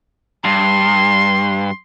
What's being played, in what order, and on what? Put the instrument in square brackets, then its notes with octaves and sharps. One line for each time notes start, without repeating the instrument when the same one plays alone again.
[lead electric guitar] G2 [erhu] C6